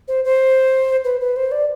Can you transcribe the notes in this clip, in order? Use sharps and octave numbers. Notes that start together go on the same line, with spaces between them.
C5
C5
B4
B4
C5
D5